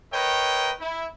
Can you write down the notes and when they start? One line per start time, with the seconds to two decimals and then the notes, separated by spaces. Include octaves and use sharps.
0.12 A#4 B4 C#5 D#5 G5
0.80 E4